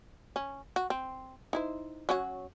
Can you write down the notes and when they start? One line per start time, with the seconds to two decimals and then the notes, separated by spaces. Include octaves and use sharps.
0.36 C#4
0.76 F#4
0.90 C4
1.53 D#4 E4 C5
2.09 F#3 C#4 F#4